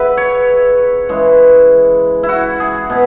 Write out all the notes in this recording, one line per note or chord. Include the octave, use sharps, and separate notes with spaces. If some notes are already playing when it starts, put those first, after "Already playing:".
Already playing: C#3 F#3 B4 E5
C#5
C#3 E3 G#3
E4
F#4
G#4
B2